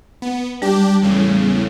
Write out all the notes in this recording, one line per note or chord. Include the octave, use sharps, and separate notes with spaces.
B3
G3 D4 G4
E2 A2 C#3